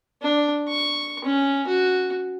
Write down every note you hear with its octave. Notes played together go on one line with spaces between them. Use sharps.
D4
C#6
C#4
F#4